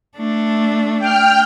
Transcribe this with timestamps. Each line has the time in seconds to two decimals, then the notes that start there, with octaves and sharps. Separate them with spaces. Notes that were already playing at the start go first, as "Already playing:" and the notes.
0.16 A3 D4
0.99 G5 F6